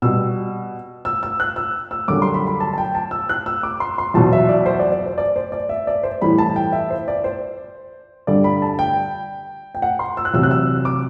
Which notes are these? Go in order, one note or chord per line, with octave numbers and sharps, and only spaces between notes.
B2 G3 E6
E6
E6
F#6
E6
E6
F#2 D3 G3 D6
C6
B5
B5
A5
A5
G5
A5
E6
F#6
E6
D6
C6
C6
E2 B2 F#3 A5
E5
D5
C5
D5
D5
C5
D5
C5
D5
E5
D5
C5
A2 E3 G3 B5
A5
G5
E5
C5
D5
C5
G2 D3 G3 D5
B5
A5
G5
G5
F#5
C6
E6
F#6
E2 C3 F#3 E6
F#6
E6
D6